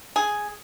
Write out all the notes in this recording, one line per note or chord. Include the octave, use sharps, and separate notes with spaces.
G#4